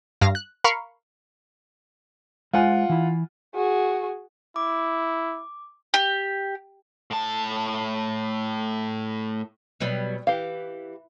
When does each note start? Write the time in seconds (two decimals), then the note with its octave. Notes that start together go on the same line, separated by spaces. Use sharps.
0.21 G2 F5 A#6
0.35 F#6
0.64 A#4 F5 B5 C#6
2.53 G#3 F4 C5 F#5 G#5
2.89 E3 E4
3.55 F#4 G#4
4.56 E4 D6
5.94 G4
7.11 A2 A5
9.80 B2 F#3 G3
10.27 E3 G4 F5